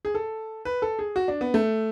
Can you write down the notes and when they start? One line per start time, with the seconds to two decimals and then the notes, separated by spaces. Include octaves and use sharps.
0.05 G#4
0.15 A4
0.65 B4
0.82 A4
0.99 G#4
1.16 F#4
1.28 D4
1.41 B3
1.54 A3